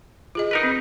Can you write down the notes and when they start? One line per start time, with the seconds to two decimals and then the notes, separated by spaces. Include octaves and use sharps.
0.35 F4 G#4 D#5
0.51 D#4 A#4 B4
0.63 C4